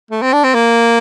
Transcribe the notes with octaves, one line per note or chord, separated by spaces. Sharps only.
A3
C4
D4
C4
A#3